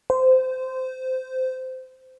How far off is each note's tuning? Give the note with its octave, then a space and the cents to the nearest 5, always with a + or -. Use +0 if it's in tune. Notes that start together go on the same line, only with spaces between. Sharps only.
C5 -20